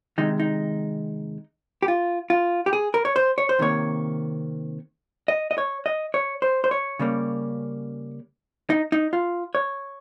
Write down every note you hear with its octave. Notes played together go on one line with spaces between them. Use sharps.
C3 D#3 G#3 D#4
D#4
G4
F4
F4
G4
G#4
A#4
C#5
C5
C#5
C5
C3 D#3 A#3 C#5
D#5
D#5
C#5
D#5
C#5
C5
C5
C#5
C#3 G3 A#3 C#4
D#4
D#4
F4
C#5